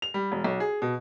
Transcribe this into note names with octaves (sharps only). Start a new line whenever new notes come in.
F7
G3
E1
B1
G#4
B2